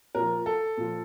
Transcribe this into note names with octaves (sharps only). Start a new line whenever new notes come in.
A#2 F3 A#4
A4
A#2 F3